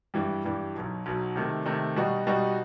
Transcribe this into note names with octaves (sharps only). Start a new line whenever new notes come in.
G2 E3 G3
G2 E3 G3
B1 B2 F#3
B1 B2 F#3
C3 D#3 A3
C3 D#3 A3
B2 G3 D#4 F#4
B2 G3 D#4 F#4